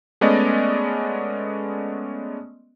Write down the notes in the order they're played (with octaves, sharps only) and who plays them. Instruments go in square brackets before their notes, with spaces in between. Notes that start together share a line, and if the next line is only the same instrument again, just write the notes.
[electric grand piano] G#3 A3 B3 C#4 D5 D#5